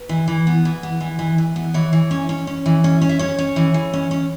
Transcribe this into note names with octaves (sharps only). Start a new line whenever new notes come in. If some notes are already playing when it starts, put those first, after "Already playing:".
Already playing: B4
E3
E3
B3
E3
B3
E3
E3
E3
B3
E3 C#5
E3
C#4
C#4
C#4
E3
C#4
C#4
E5
C#4 C#5
C#4
E3
E3
C#4
C#4